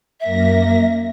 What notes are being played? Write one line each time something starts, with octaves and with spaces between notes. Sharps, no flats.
F#2 A#3 E5 A#6